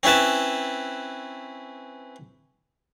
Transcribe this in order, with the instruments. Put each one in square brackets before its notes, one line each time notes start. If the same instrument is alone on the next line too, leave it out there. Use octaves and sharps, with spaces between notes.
[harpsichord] C4 C#4 E4 B4 A5